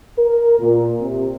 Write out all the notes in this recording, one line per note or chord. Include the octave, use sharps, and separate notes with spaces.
A#4
A#2
C3